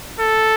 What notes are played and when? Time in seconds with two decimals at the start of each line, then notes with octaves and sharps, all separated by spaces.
0.20 A4